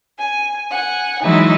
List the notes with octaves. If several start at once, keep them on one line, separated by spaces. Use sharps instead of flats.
G#5
F#5 G#5
E3 F#3 G#3 D#4 E4